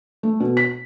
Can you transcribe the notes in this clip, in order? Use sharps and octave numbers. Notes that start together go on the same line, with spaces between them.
A3
B2
B6